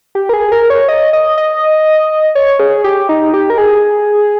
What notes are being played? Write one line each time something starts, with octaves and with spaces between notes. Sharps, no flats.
G4
A#4
G#4
A#4
C#5
D#5
D#5
D#5
C#5
G#4
G4
D#4
G4
A#4
G#4